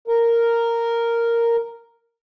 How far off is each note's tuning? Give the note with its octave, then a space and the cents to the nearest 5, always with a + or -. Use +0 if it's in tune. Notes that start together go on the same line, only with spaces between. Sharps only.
A#4 -5